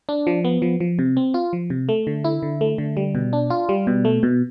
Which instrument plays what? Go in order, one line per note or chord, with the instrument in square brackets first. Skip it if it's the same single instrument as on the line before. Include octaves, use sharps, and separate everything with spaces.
[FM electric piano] D4
F3
B3
F3
F3
C3
C4
F4
F3
C3
A3
D3
E4
D3
A3
D3
G3
B2
D4
F4
G3
B2
A3
B2